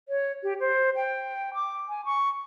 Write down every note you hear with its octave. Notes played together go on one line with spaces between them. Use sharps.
C#5
G4
C5
G5
D6
G#5
C#6